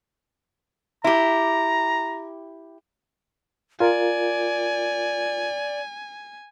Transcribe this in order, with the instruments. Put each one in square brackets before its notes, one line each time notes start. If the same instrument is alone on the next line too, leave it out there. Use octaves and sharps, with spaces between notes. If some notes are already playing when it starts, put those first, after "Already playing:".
[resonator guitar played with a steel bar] E4 G4 [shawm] A#5
[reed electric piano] F4 A#4 [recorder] D5 [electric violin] G#5